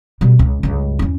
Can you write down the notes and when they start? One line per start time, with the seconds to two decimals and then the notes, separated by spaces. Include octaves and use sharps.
0.21 B2 G3
0.39 C#2
0.63 C#2 G2
0.99 E2 C#4